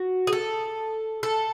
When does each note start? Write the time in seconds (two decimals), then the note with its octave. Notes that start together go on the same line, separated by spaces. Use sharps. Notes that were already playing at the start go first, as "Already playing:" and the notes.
Already playing: F#4
0.27 G#4
0.33 A4
1.23 A4